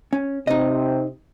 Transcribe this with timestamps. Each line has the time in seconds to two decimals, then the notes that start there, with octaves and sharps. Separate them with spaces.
0.13 C#4
0.47 C3 C4 D#4 D#5